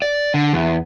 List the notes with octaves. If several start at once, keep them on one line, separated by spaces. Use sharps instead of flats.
D5
D3
E2